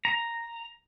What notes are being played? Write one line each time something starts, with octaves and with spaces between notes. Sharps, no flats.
A#5